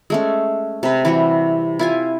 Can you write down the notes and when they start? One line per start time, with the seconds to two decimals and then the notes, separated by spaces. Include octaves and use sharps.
0.10 G#3 A3 C#4
0.83 C3 B4
1.05 E3 G3 F#4
1.79 E4 F4 G#5